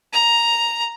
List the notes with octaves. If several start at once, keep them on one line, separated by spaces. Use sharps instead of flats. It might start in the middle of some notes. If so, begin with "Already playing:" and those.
A#5